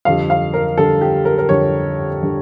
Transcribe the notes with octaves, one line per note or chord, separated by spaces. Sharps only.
F2 D3 G3 F5
F5
A#4
F2 D3 G3 A4
G4
A#4
A#4
F2 D3 G3 C#5
D3 G3